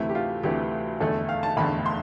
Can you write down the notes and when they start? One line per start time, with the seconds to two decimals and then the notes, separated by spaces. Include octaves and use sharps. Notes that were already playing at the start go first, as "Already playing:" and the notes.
Already playing: D2 C3 E3 A3 E4
0.09 G4
0.15 F4
0.43 D2 C3 E3 A3 G4
1.00 F1 E2 D3 A3 A4
1.29 F5
1.43 A5
1.57 F1 E2 D3 A3 B5
1.86 C6